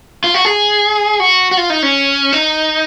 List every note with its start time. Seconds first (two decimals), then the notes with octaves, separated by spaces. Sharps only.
0.24 F4
0.34 F#4
0.45 G#4
1.20 F#4
1.51 F#4
1.57 F4
1.70 D#4
1.83 C#4
2.33 D#4